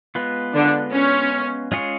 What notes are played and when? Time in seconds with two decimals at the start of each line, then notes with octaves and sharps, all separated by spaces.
0.15 G#3 B3 F4 B4
0.54 D3 D4
0.93 C#4
1.72 G#3 C#4 F4 G#4 C#5